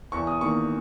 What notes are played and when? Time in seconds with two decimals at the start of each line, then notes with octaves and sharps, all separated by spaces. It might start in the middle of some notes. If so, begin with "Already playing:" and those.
0.12 E2 C#6
0.27 D#6
0.41 D#3 A#3 C#6